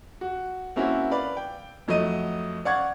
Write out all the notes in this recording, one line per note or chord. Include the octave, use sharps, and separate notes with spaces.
F#4
A#3 C4 C#4 E4 F#4
B4 D5 F5
G5
F2 F#3 A3 D#5 D#7
D5 F5 F#5 C#6 G#6